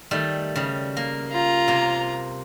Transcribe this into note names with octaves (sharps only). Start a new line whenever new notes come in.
D#3 G3 A3
C#3 G3
A#3
F4 A#5
C3 A#3